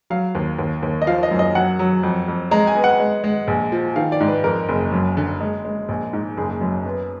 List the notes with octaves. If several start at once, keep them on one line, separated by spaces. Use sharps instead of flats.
F#3 F5
D#2
D#2
D#2
D#5
F3 F5
D#5
F#2
D#5
F#3 F#5
F#3
F2
F2
G#3 A#5
G#5
B3
F#5
G#3
G#3
A#1
F3
D#3 F5
D5
G#2
B4
F2 A#4
F#1
F#2
D3
G#3
G#3
A#1
G#2
F#1 G#4
F#2
B3